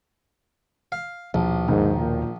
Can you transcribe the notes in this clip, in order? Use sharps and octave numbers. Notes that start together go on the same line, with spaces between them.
F5
A#1 D#2 B2 F3
G#2 D#3
A#2